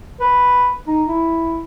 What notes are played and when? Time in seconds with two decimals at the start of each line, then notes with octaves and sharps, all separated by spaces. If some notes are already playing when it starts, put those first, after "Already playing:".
0.21 B4
0.87 D#4
1.08 E4